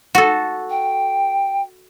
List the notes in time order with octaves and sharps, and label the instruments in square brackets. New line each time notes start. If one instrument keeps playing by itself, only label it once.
[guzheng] F#4 A4
[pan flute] G5